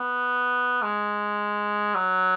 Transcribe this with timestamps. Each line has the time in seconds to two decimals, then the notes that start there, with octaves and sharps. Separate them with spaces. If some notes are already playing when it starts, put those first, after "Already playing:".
Already playing: B3
0.82 G#3
1.95 F#3